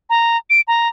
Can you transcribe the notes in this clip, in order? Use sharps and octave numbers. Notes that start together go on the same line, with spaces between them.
A#5
D7
A#5